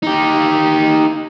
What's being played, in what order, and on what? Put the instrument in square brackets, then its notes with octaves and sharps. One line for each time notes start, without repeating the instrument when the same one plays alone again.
[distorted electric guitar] D#4 G4